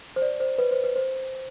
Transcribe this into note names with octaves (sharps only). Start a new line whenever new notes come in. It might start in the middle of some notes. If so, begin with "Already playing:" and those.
C5
D5
C5
B4
C5
B4
C5